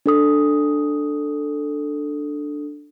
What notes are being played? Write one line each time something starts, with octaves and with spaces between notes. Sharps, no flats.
D4 A4 D#6